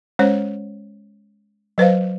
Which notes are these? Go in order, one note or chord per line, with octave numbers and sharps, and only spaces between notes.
G#3 C#4 C5 C#5
F#3 B4 C5 F5